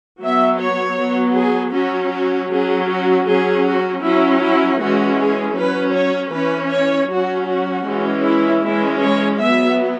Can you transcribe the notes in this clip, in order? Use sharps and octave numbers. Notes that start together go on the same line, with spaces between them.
F#3 B3 E5
C#5
F#3 B3
G#4
F#3 C#4 F#4
F#4
F#3 C#4 G#4
F#4
F#3 C#4 G#4
F#4
F#3 C#4 E4
E4
E3 G#3 C#4 F#4
G#4
F#3 C#4 B4
C#5
E3 C#4 B4
C#5
F#3 C#4 F#4
F#4
E3 G#3 C#4
E4
E3 G#3 C#4 E4
C#5
F#3 B3 E5